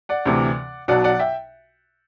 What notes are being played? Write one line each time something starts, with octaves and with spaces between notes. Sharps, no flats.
D5 F#5
D2 C3 E3
B1 B2 F#3 D5 F#5
D5 F#5
E5 G5